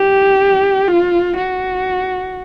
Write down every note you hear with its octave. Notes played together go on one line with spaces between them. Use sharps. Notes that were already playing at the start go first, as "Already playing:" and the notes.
Already playing: G4
F4
F#4